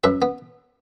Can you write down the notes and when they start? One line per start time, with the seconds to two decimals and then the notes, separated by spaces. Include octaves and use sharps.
0.04 F#2 B4 E5
0.22 B3